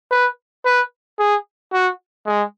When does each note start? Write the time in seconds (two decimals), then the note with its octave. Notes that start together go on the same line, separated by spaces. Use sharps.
0.11 B4
0.65 B4
1.19 G#4
1.73 F#4
2.27 G#3